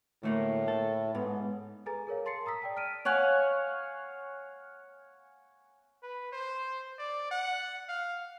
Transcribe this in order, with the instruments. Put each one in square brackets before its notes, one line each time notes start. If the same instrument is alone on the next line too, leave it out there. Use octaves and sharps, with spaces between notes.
[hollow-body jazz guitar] D2 A3 A#3 [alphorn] A2
[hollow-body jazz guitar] A4
[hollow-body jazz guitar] G#2 [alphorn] B3
[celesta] G#4 A4 B4 G#5 A#5 A6
G#4 A#4 C#5 F5
A5 C6 A6 C7 C#7
A#5 D#6 E6 B6
D5 G5 A5
F6 B6 D7 D#7
[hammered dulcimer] C#5 F5 F#5 G#5
[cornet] B4
C5
D5
F#5
F5